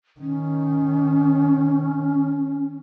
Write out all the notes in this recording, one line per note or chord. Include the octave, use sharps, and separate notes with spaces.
D#3 C#4